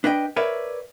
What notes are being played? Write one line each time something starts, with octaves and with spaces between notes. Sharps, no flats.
D4 B4 D#5 G5
A#4 B4 C#5 D5 E5